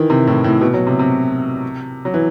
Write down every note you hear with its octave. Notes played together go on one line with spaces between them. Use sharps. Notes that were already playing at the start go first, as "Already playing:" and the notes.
Already playing: D#3 E3
C3
A2
A2
B2
F#3
C3
C3
F#3
E3